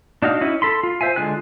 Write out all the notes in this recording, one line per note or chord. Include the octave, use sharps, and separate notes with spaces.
D4 D#4 F#4 F5
C#4 D#4 E4
A4 B5 C6
F4
C5 E5 F5 G#5
D3 G#3 F4 G#5 F#6